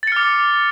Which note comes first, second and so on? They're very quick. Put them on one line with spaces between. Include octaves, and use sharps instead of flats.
A6 C#7 F6 D6